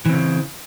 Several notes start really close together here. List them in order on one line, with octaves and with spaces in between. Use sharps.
E3 C4 C#3